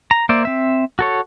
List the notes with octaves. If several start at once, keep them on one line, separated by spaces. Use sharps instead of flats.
A#5
A#3 C5 D5 E5
C4 E5
F#4 A4 C#5